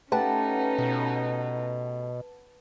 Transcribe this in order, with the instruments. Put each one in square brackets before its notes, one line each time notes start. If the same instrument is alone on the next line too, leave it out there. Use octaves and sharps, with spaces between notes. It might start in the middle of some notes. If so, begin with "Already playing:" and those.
[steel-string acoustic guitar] A3 G4 [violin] C#4 D#4 [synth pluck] B4 F#5 A5
[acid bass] B2